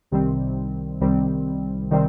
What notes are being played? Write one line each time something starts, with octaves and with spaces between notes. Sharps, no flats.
C2 C3 D#3 G3 C4
C2 C3 D#3 G3 C4
C3 D#3 G3 C4